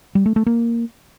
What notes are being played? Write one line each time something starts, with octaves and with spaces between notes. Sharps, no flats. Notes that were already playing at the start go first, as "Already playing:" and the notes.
G3
A3
A3
A#3